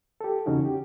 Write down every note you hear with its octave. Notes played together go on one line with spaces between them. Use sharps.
G4 A4
E2 C#3 C#4 D#4 F#4
G4